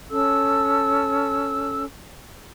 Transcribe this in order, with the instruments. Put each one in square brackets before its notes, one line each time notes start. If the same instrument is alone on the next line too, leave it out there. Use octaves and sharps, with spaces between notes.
[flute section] C#4 A4 E6